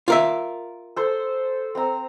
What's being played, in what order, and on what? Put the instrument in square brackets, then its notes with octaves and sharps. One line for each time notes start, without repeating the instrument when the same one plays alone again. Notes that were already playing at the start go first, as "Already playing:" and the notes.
[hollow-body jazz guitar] F4 A#4 E5
[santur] A4 C5
C4 A#5